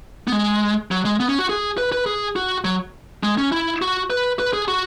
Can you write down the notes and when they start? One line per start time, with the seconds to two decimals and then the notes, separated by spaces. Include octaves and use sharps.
0.27 B3
0.32 G#3
0.91 F#3
1.05 G#3
1.20 B3
1.29 C#4
1.39 F#4
1.49 G#4
1.78 B4
1.92 B4
2.06 G#4
2.36 F#4
2.64 F#3
3.23 G#3
3.38 C#4
3.52 E4
3.82 F#4
4.10 B4
4.39 B4
4.53 G#4
4.68 F#4